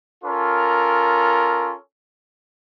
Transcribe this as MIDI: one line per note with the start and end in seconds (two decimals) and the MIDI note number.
0.24 1.74 61
0.24 1.74 65
0.24 1.74 69
0.24 1.74 70